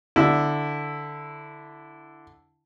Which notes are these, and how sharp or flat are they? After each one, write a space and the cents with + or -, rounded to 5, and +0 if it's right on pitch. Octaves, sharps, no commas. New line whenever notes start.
D3 +0 E4 +0